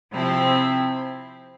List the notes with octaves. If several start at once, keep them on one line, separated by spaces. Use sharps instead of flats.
C3 F3 C4 E4